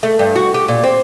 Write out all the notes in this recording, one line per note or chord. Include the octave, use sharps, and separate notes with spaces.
A3
G2
F#4
G4
A#2
C4